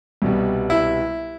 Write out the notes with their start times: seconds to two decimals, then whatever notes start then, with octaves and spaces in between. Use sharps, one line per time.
0.22 C2 B2 G3
0.70 E4